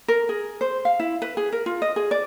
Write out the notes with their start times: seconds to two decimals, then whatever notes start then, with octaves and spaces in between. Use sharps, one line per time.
0.08 A#4
0.29 G#4
0.61 C5
0.85 F5
1.00 E4
1.22 B4
1.37 G#4
1.52 A#4
1.66 F4
1.82 D#5
1.96 G#4
2.11 D5